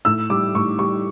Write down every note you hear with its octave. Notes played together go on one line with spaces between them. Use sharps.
A2 E6
G3 D6
A2 C#6
G3 C#6